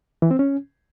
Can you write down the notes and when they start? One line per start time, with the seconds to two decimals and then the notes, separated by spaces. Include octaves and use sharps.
0.22 E3
0.31 C4
0.39 C#4